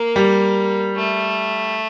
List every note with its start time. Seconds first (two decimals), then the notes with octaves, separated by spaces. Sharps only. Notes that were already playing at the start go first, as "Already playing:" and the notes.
Already playing: A#3
0.16 G3
0.96 A3